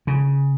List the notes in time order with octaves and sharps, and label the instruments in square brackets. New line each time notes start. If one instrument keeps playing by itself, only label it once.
[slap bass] C#3